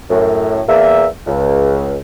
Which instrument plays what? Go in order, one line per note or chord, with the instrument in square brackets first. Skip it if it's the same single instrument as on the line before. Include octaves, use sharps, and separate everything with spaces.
[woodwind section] F#2 A2
E2 A#3 E5
C#2